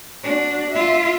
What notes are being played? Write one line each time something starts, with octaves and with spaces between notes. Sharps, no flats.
D4 F#4
F4 E5